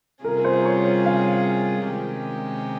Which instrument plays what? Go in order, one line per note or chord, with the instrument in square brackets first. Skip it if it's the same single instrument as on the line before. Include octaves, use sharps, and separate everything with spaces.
[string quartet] C3 G3 C#4 F4 G#4 [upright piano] A#4
[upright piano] C5
C#5
C#5
F5
[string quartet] C3 D#3 G#3 C#4 G4